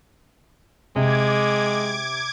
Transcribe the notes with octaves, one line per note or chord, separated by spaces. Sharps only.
C3 G#3 D6 G#6